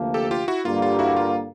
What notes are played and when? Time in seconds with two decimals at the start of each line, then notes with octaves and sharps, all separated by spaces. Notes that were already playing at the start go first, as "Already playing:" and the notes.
Already playing: D2 C3 F3 A#3
0.14 G4 A4
0.31 F4 G4
0.48 E4 F#4
0.65 G2 D3 G3 A#3 F4
0.82 F4
0.99 E4 F#4
1.16 F4